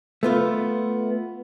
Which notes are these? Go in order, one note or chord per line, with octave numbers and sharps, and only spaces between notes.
A3 B3 F4